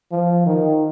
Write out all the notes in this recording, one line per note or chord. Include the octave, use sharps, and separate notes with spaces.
F3
D#3